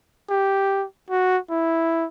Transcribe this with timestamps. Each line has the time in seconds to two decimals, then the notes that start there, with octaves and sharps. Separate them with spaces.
0.30 G4
1.10 F#4
1.50 E4